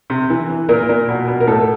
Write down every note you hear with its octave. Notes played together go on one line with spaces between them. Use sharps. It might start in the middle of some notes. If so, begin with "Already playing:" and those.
C3
E3
E3
A#2 A#4
A#2
B2
B2
A#4
A2 A4